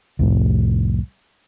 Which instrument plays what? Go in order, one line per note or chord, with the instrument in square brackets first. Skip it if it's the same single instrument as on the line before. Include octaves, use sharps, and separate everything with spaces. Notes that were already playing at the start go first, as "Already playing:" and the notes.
[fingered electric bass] C2 F2 A2